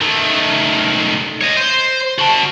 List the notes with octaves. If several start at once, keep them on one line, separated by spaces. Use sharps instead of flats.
D#3 A3
C#5 D#5
C5
F#4 A5